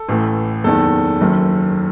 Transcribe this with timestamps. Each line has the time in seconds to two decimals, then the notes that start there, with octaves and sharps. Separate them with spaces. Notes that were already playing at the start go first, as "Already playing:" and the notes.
Already playing: A4
0.09 A1 A2 E3
0.64 F#1 E2 D#3 A4
1.20 F#1 F#2 D#3